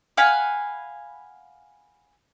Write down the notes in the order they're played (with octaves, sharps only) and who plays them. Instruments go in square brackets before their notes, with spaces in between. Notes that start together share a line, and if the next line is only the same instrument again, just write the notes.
[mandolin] F5 F#5 G#5 B5